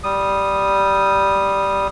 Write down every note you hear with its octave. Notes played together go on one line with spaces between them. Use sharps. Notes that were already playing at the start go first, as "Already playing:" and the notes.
G3 D#6